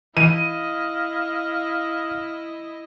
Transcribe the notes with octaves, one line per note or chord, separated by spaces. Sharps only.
E3 E4 D#5 F5 D#7